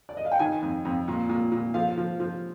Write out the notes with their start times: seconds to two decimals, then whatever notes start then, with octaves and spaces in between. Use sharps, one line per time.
0.09 D5
0.17 D#5
0.25 F5
0.32 G5
0.39 D#3 G#5
0.62 F2
0.85 F2
1.08 A#2
1.29 A#2
1.52 A#2
1.74 F3 F5
1.98 F3
2.20 F3